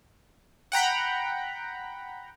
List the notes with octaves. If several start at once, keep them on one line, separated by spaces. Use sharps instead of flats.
F#5 G5 A#5 B5